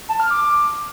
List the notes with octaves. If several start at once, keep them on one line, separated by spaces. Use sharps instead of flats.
A5
F6
D6
D6